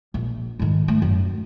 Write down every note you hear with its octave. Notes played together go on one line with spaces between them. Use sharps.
A#1
G#2 D#3
A3
F#2